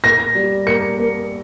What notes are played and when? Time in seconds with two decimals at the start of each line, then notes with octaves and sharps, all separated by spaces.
0.04 A#3 A#6
0.35 G3
0.67 A#3 C#7
0.98 A#3